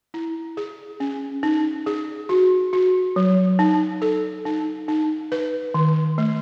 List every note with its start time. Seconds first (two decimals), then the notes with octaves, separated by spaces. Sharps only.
0.14 E4
0.57 G#4
1.00 C#4
1.43 D#4
1.86 G#4
2.29 F#4
2.73 F#4
3.16 F#3
3.59 D#4
4.02 A4
4.45 D#4
4.88 D#4
5.32 B4
5.74 D#3
6.18 A3